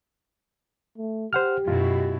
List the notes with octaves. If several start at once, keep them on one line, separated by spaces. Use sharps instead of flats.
A3
G4 C5 F#5 F6
F#2 B2 E4 F4